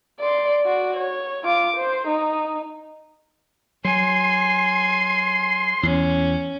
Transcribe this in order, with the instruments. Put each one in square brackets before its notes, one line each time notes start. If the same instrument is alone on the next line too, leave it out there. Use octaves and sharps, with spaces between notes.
[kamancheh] D5 C6
F#4 D5
C#5
F4 D6
C5
D#4
[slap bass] F#3 [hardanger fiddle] G#5 [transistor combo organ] C6
[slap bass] E2 [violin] C#4